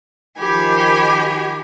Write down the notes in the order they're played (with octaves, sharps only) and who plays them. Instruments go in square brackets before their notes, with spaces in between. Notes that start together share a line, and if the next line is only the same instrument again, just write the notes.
[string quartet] D#3 F3 G4 G#5 B5